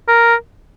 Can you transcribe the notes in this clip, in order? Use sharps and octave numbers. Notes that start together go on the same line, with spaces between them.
A#4